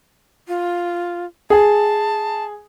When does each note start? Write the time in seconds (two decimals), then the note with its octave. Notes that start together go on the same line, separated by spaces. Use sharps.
0.48 F4
1.50 G#4 A5